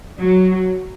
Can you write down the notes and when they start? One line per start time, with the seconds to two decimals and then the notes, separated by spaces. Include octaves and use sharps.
0.19 F#3